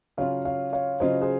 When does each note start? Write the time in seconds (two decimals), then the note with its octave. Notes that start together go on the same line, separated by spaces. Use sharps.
0.17 C#3 F#3 C#4 F4 C#5 F5
0.45 C#5 F5
0.73 C#5 F5
1.00 C#3 F#3 C#4 F4 C5 D#5
1.22 G#4 C5